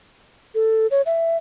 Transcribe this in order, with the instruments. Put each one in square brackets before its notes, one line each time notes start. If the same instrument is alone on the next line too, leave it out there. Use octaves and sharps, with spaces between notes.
[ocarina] A4
C#5
E5